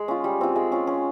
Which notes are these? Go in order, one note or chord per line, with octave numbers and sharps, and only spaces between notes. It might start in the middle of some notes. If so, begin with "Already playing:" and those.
Already playing: G#3
C#4 F4
G3
C4 F4
G#3
C#4 F4
C#4